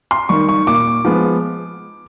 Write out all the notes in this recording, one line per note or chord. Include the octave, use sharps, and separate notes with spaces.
C6
D#3 G3 C#6
C#6
A#2 D6
F3 G#3 B3